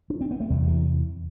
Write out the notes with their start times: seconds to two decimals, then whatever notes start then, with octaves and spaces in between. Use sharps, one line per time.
0.10 D4
0.21 C4
0.31 B3
0.40 A3
0.50 E2 C3 G3
0.67 E3